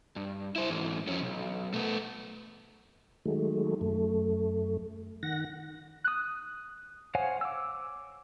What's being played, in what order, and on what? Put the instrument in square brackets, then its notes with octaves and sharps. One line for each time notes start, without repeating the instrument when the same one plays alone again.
[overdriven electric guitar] G2
E4 C5
G#2 E3
F2 C#4
B1
A3 B3
[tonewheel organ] D#3 F#3 G#3 A3
F#2 A3
D#3 F#5 A#6
[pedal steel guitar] D#6 F#6
C5 C#5 F5 F#5 G#5
D6 E6